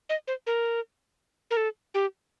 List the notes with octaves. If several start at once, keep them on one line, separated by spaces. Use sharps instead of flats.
D#5
C5
A#4
A#4
A4
G4